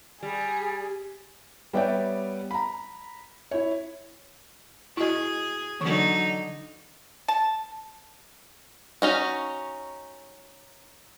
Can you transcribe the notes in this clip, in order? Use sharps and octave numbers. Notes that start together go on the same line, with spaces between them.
G3 G#4
G3 B3 C#5 D5 E5 G5
A#5 B5
E4 C#5
E4 F#4 G#4 D#5
D3 E3 F#3 D#4 C#6
A5
C#4 D#4 F#4